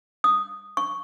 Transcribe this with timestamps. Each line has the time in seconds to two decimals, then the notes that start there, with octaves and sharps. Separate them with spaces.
0.24 D#6
0.77 C#6